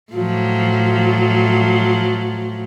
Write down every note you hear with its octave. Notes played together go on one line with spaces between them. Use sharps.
A2 F3 F#3